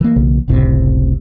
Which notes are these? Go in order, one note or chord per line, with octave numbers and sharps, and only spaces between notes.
E3 A#3
B1 C#3 E3 A#3
F#1 C#2 A2 C3